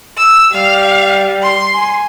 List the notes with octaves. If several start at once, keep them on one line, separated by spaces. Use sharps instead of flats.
E6
G3 F5
C6
G#5